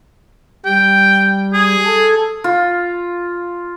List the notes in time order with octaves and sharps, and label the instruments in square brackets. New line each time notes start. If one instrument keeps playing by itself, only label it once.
[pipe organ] G3 [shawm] G5
[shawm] G#4
[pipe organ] A4
[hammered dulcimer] F4